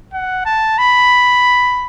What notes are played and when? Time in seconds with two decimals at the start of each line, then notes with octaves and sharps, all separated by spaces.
0.13 F#5
0.46 A5
0.78 B5